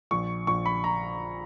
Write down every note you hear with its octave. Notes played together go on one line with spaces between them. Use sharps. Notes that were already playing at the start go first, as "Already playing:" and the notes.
A#1 C#6
A#1 C#6
B5
A#5